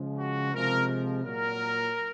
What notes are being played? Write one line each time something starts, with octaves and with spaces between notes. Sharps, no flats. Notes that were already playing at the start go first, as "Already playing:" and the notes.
Already playing: C#3 F3 G#3
F#4
C3 F3 G#3 A#4
A#2 F#3 A#4